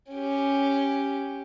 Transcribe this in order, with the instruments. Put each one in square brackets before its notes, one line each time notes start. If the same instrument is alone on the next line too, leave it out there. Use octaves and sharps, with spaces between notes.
[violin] C#4 G4